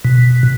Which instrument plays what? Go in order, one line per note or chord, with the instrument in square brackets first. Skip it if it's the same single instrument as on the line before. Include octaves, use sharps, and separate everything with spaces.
[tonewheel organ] B2